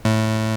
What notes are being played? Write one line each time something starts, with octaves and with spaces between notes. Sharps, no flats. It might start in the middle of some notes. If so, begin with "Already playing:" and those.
A2